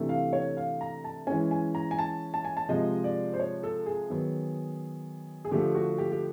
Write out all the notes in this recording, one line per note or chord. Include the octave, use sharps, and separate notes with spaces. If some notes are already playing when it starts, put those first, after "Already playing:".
Already playing: C3 E3 A3 D4
F5
C#5
F5
A#5
A5
E3 G#3 C#4 G#5
G#5
A#5
G#5
A5
A5
G#5
A5
C3 F3 G#3 D#5
D5
C5
C#5
A4
G#4
D#3 F#3 B3
G#4
D3 F3 A3 G4
F#4
G4
G4